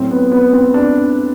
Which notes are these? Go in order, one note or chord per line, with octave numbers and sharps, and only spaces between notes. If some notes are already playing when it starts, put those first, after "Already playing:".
Already playing: A2 F#3 C4
B3
B3
C4
D4